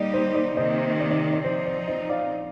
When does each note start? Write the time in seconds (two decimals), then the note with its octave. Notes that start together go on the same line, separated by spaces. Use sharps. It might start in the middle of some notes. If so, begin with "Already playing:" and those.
Already playing: G3 A#3 D#4 G4 D5 D#5
0.13 C5
0.35 D5
0.57 C3 D#3 A#3 C5 D#5
1.00 D5
1.11 D5
1.33 D5
1.44 F3 C4 D#4 C5
1.66 D5
1.88 C5 D#5
2.09 D5 F5